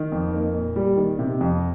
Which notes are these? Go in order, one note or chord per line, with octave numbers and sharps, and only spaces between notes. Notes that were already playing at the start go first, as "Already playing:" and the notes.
Already playing: D#3
F2
A#3
A#2
G3
D#3
C3
F2